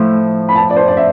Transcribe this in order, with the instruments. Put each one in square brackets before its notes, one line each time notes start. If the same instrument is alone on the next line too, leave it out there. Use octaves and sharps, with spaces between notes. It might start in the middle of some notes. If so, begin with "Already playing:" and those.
Already playing: [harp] A2 F3 A3 E4
[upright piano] B5
A5
D5
C5
D5
E5